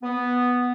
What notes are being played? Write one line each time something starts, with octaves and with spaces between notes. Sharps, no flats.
B3